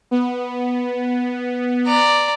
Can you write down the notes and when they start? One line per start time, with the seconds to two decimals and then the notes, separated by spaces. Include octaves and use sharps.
0.11 B3
1.87 D5 A#5